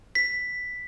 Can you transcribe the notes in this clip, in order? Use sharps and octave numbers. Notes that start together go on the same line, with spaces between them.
B6